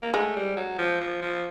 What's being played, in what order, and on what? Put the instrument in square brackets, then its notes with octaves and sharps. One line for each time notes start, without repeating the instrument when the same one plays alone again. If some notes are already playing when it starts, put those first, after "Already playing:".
[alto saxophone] A#3
[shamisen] G#3 [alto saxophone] A3
[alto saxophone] G3
F#3
F3
F3
F3